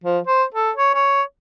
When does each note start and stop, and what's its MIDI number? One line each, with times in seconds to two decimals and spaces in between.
0.04 0.19 53
0.27 0.44 72
0.54 0.71 69
0.76 0.91 73
0.94 1.22 73